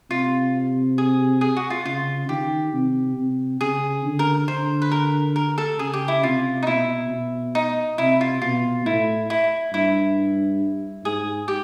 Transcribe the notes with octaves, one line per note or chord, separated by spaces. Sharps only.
C3 F4
G#4
G#4
F#4
F4
C#3 F4
D#3 G4
C3
C3
C#3 G#4
D3
A#4
D3 C5
B4
A#4
A#4
A4
C#3 G#4
G4
E4
C3 F4
D#4
B2 E4
B2
D#4
C3 E4
F4
B2 F4
A2 E4
E4
G2 E4
G#2 G#4
G4